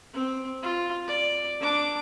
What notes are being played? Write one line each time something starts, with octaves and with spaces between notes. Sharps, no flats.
C4
F4
D5
D4 D6